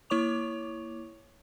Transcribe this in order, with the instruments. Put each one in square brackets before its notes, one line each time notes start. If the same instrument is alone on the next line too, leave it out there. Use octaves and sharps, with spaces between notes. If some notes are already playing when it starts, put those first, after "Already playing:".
[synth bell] A#3 E4 C#5 C#6 D6 F7